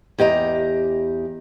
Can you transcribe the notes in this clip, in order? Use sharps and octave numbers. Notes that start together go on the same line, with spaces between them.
E2 G4 D#5 A#5